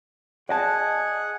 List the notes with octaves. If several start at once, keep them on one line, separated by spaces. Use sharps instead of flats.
G#4 D5 D#5 F#5 A5